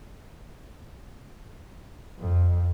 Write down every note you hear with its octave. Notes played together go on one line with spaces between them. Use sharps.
F2